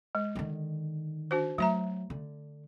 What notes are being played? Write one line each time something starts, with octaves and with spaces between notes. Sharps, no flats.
G#3
D3 D#3
D4 F#4 C5
F#3 A3 E5 A#5
D3